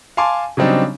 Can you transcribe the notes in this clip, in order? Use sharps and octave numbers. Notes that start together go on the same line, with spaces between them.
F5 G#5 A5 C6 D6
C#3 F#3 G3 C4 D4 D#4